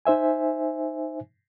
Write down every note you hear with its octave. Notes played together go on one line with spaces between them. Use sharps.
D#4 C5 E5 G#5